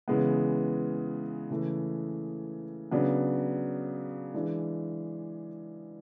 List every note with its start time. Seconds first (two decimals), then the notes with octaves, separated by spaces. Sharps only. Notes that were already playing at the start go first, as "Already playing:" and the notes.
0.08 C#3 E3 G#3 B3
1.50 C#3 E3 A3
2.91 C#3 F#3 B3 D4
4.34 E3 G#3 D4